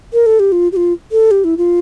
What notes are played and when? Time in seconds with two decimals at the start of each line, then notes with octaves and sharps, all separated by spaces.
0.13 A#4
0.26 A4
0.40 G4
0.52 F4
0.72 G4
0.77 F4
1.12 A4
1.31 G4
1.44 E4
1.57 F4